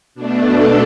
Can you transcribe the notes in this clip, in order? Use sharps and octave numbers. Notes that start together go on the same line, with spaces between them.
B2 A3 D4
A4